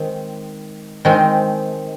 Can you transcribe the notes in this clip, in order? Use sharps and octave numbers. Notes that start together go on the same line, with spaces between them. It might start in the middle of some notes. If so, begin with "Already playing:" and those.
Already playing: D#3 G#3 C4
D#3 G#3 C4